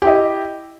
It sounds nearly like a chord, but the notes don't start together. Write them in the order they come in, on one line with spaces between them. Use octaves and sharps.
G4 E4 D#5